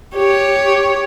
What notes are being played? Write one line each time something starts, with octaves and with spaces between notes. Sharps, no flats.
G4 C#5